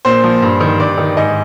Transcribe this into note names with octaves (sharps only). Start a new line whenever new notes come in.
A#2 C5
F3
G2
D#3
G2 D5
D#3
G#2 D#5